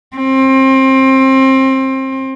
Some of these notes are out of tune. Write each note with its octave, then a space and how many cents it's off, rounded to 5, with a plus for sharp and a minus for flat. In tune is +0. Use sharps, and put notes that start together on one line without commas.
C4 +25